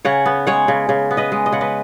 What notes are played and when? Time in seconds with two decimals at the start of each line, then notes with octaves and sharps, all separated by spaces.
0.05 C#3 C#5 F#5
0.26 B3
0.47 G#3 C#5 F#5
0.68 C#3
0.89 C#3
1.11 B3
1.17 B4 D#5
1.32 G#3
1.46 D#5
1.52 C#3 F#5
1.61 B4 D#5